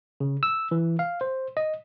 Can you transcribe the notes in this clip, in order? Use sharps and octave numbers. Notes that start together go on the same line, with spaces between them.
C#3
E6
E3
F5
C5
D#5